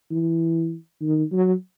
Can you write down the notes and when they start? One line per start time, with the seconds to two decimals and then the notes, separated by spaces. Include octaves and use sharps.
0.11 E3
1.02 D#3
1.32 F#3